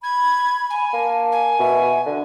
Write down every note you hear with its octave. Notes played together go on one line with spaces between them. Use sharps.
B5 G#6
G#5
A#3 A5
G#5
B2 E5
D3